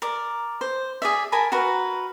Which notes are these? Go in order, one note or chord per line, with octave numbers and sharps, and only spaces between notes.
A#4 D5
C5
G#4 D5 E5
A#4 G#5 A5 B5
F#4 A#4 B4 A#5